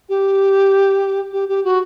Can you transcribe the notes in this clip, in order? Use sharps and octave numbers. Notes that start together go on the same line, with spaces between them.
G4
G4
G4
F#4